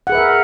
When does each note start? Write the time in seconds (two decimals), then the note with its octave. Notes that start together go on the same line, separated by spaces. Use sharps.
0.07 F#5
0.10 G#4
0.12 B4
0.15 E5
0.17 A#4